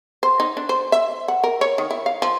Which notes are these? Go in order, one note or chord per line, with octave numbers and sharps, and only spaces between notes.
C5
D#4
D4
C5
E5
F#5
A#4
C#5
D#3
E4
F5
F3